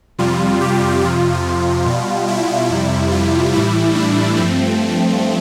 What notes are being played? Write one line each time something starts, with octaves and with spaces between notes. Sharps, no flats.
F2 C3 G3 F4
G4
F2 C3 F3 F4
B2 G3
E4
F2 C3 G3
F4
A2 E3 G3 E4
D4
G2 F3 A3 C4